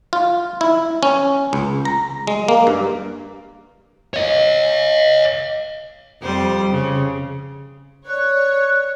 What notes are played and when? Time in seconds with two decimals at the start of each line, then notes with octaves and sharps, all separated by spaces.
0.13 F4
0.61 E4
1.03 C#4
1.53 C#2
1.85 A#5
2.27 G#3
2.48 A#3
2.67 G2
4.14 C#5 D#5
6.21 F2 G3 C5
6.71 C#3
8.07 C#5 D5 F#6